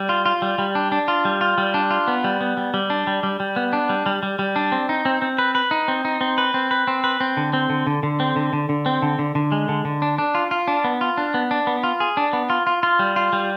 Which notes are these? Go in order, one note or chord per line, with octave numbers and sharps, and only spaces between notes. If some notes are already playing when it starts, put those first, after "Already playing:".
Already playing: G3
F4
F4
G3
G3
D4
D4
F4
G3
F4
G3
D4
F4
B3
G3
B3
G3
G3
D4
G3
G3
G3
B3
D4
G3
G3
G3
G3
D4
C4
D#4
C4
C4
B4
B4
D#4
C4
D#4
C4
B4
C4
B4
C4
B4
C4
D3
C4
D3
D3
D3
C4
D3
D3
D3
C4
D3
D3
D3
G#3
D3
D3
D4
D4
F4
F4
D4
B3
F4
D4
B3
D4
B3
F4
G#4
D4
B3
F4
F4
F4
G3
F4
G3